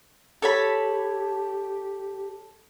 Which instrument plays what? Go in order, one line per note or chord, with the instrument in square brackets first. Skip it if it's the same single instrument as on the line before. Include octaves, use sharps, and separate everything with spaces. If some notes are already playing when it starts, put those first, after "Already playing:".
[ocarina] G4 [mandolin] A4 C#5 B5